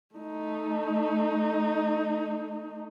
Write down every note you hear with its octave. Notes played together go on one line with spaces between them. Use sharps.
A3 D#4